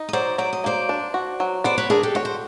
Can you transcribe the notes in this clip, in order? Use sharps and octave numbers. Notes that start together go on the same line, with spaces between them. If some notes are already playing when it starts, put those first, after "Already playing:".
Already playing: D#4
D#5
F#3 C5 D5
F#3 D5
D#5
A#3 C5 D5
D4
F#4
F#3
B3 C5 D5
B4 C#5
D4 G#4 A#4
G4 A4
F#4 C#5
C5